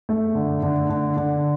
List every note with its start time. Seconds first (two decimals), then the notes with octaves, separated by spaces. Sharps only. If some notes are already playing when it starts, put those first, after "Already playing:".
0.09 A3
0.35 D3
0.63 D3
0.89 D3
1.17 D3